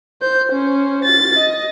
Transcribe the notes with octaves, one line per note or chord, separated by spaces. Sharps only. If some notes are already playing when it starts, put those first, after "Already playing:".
C5 G6
C#4 C5
A6
D#5